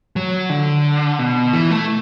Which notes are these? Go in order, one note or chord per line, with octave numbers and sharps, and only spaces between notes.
F#3
D3
B2
E3
A3